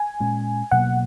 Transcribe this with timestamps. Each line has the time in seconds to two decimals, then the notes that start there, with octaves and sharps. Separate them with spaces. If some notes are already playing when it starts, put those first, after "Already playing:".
Already playing: G#5
0.20 A#2 G#3 C#4
0.71 B2 F#3 A#3 F#5